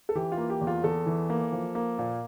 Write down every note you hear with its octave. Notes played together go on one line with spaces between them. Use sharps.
A4
E3 G4
F4
A#3
G4
E2
F4
E2 A4
E3
A#3
F3
A#3
A#2